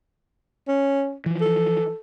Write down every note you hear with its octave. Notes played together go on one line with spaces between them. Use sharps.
C#4
E3 F3
A4